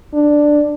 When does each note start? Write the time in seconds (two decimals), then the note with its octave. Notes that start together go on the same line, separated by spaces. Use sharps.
0.14 D4